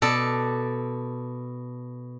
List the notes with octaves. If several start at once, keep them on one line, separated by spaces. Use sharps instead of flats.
B2 A4 D5